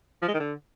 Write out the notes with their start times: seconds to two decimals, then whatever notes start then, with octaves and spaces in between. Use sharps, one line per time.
0.22 F3
0.28 G#3
0.34 D#3
0.40 D3